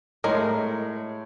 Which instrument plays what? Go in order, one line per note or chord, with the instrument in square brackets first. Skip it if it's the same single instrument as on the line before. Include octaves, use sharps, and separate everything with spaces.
[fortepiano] A2 [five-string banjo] G#3 A#4